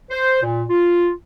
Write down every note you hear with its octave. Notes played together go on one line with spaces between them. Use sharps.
C5
A#2
F4